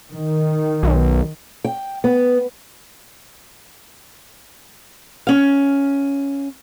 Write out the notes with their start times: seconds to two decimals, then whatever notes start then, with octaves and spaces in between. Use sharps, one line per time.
0.10 D#3
0.83 B1
1.64 G5
2.04 B3
5.27 C#4 F5